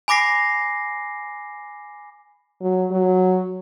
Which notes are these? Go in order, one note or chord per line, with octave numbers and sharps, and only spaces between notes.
G#5 B5 D6 A#6 C7
F#3
F#3